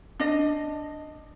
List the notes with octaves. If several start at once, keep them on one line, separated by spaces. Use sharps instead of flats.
D4 D#5